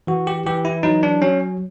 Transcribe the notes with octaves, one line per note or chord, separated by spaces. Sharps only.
E3 F#4
G4
E3 G4
E4
F#3 D#4
D4
F#3 C#4